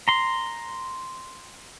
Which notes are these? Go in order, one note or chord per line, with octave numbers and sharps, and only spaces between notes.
A#5 C6